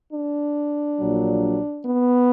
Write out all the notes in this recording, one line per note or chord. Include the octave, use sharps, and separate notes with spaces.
D4
A#1 A#2 F#3
B3